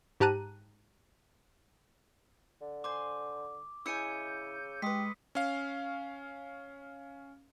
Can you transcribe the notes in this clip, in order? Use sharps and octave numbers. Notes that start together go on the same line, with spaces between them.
G#2 G4 A5 A#5 F#6 D#7
D3
C5 G#5 C6 D6
C#3 E4 D#5 G#5 E6 G6 C#7 D#7
G#3 G4 B4 C6 D#6 B6
C#4 F5